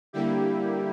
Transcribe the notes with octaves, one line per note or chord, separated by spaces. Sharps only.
D3 G3 A#3 E4 G4